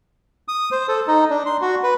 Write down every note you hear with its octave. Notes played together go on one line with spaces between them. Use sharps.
D#6
C5
A4
D#4
D4
C6
F#4
B4